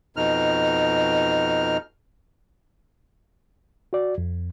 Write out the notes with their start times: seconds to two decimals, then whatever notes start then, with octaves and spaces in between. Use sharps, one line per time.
0.17 F2 B2 D#4 F6
3.93 F#4 D5
4.18 F2